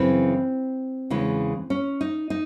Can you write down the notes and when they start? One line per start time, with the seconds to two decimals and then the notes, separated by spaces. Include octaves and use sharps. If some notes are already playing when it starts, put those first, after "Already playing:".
Already playing: F#2 C#3 E3 C4
1.10 E2 C#3 E3 G#3
1.70 C#4
2.01 D#4
2.30 D#4